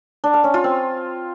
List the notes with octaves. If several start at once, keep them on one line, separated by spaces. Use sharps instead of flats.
D4
F5
C#4
F4
C4